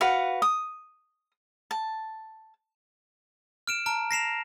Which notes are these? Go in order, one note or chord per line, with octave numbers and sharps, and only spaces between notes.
F#4 B4 F5 F#5
D#6
A5
F6 D7 E7
A5 A#5 F6 D7
A#6 C7 E7 F7